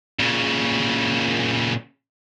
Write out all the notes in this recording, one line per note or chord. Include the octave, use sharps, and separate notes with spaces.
A#2 C#3